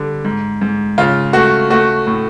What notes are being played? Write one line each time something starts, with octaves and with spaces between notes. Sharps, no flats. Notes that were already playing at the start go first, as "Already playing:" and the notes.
Already playing: D3 G3
G#2
G#2
C#3 F4
A3 F#4
A3 F#4
A2